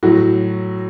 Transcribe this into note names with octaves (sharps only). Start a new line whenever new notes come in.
A2 F#3 F#4